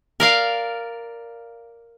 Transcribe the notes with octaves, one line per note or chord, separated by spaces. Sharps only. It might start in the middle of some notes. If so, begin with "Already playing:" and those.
A#4 D5 F5